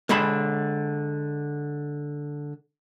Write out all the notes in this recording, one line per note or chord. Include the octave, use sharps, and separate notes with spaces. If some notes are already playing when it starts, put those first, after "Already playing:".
D3 G#3 A5 B5